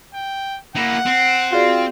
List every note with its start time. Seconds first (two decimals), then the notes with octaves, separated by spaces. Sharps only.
0.15 G5
0.76 A#3 E4 F#5
1.06 C4
1.52 F4 F#4 G#4 D5